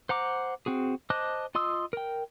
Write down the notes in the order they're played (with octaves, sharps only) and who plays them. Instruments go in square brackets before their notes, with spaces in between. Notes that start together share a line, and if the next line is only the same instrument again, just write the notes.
[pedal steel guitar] C5 F#5 A#5 D6
C4 F#4 G#4
C5 D#5 A5 D6 F#6
F4 D#5 C6 D#6 E6
A#4 G5